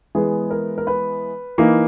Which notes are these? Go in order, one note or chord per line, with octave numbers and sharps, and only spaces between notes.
E3 G#3 B3 G#4
A#4
A#4
B4
E3 A#3 D#4